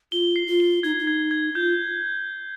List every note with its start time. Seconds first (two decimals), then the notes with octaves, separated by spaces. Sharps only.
0.12 F4 G7
0.36 C7
0.47 F4
0.60 G7
0.83 D#4 G#6
0.99 D#4
1.07 G#6
1.31 G#6
1.55 F4 G6